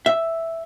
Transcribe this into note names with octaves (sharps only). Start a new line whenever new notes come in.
E5